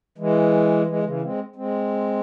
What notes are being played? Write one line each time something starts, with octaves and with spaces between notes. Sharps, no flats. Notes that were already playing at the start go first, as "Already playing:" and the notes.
E3 G#3
E3 G#3
C#3 E3
G#3 C4
G#3 C4